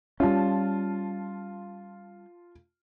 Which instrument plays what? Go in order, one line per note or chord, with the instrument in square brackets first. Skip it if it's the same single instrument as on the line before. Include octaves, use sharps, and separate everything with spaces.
[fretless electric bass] G3 C#4 [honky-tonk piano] F4 A5